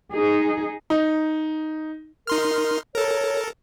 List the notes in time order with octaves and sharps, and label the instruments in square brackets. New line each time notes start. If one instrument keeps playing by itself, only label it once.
[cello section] D#4 G#4
[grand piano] D#4
[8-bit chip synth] D#4 C6 F6 [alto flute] A#4
[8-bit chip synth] A4 A#4 [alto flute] C#5